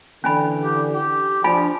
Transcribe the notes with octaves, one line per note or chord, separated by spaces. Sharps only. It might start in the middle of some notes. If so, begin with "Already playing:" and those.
D3 E3 C#4 G#5 B5
G4
G4
F3 D4 F4 G#5 B5